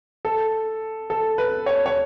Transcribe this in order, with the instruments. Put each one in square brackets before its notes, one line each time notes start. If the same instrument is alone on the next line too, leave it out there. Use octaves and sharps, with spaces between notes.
[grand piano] A4
A4
B4
C#5
C#5